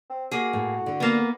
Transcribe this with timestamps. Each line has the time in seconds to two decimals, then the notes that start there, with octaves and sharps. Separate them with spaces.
0.10 C4
0.31 A#3 F#4 G#4
0.53 A2
0.86 D3
1.00 A#3 B3